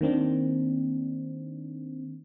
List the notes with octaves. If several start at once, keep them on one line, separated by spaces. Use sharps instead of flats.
D#3 A#3 C4 D4